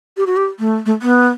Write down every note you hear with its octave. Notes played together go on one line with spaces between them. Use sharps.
G4
F#4
G4
A3
A3
B3